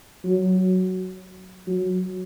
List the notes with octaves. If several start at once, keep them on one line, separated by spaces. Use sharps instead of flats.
F#3
F#3